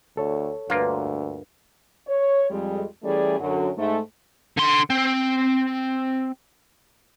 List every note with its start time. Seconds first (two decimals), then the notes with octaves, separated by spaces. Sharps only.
0.17 D2 A4 C#5
0.70 D2 G2 A#3 F4
2.07 C#5
2.51 F2 G3 G#3
3.03 E3 G3 A3 C#4 G#4 D5
3.39 F#2 D3 F#3
3.77 G#2 A3
4.57 D3 C6
4.90 C4